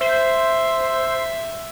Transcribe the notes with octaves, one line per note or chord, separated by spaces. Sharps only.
C5 E5